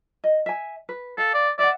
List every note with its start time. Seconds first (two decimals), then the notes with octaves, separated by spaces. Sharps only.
0.24 D#5
0.46 E5 G#5
0.89 B4
1.18 A4 F5
1.34 D5
1.59 D5 E5 F#5